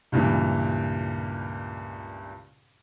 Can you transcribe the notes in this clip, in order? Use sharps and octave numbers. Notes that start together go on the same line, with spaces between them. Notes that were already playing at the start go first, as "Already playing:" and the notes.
C#2 G2 A#2 E3